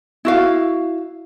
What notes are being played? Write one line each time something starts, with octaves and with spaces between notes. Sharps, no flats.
E4 F#4 F5